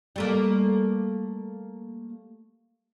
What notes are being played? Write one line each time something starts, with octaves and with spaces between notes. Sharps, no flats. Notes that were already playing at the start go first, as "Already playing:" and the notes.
G3 A3 A#3